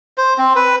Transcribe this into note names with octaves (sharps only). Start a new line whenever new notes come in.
C5
C4
B4